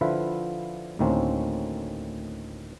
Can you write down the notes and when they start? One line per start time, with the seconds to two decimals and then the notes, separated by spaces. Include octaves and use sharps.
0.01 D3 F3 E4 F4 B4 E5
0.99 D2 A2 D#3 A#3 C4 C#4